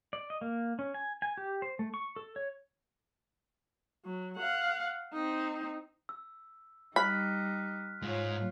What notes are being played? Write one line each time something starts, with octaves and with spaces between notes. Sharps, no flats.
D5
D#5
A#3
C#4
G#5
G#5
G4
C5
A3
C#6
A4
C#5
F#3
F5 F#5
C4 D#4
E6
G3 D#4 B5 F6 F#6 B6
G#2 F4 C#5